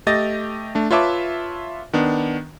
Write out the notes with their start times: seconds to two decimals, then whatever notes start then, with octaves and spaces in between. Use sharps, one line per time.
0.07 A3 G4 D#5 A6 A#6
0.75 A3 D4
0.91 F4 B4 C#5 E5 A5 D6
1.93 D#3 B3 D4